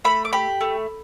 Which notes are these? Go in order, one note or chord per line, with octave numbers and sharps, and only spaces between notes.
A3 B5
D6
G4 B5
A3